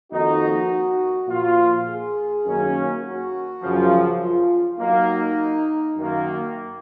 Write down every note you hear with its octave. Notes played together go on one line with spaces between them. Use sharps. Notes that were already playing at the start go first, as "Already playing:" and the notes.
F2 D#3 A#3 D#4 F#4
A#2 F3 A#3 F4
G#4
F#2 D#3 A#3 C#4
F#4
F#2 C#3 F3
F4
D#2 D#3 F#3 A#3 D#4
F#2 D#3 A#3